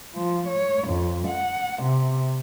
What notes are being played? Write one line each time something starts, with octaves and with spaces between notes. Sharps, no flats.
F3
C#5
F2
F#5
C3